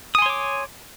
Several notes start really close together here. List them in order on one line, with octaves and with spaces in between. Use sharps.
D#6 G#5 C6 C#5 D6